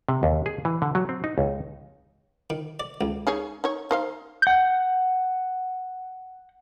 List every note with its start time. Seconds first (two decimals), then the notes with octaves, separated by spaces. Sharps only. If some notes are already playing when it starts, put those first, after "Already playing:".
0.09 C3
0.23 D#2
0.46 G#4
0.65 E3
0.82 D3
0.95 F#3
1.09 C4
1.24 D#4
1.38 C#2
2.50 D#3
2.80 D5
3.01 C#2
3.27 D#4 G#4 C#5
3.64 D#4 C#5
3.91 D#4 C5 F5
4.42 F#5 G6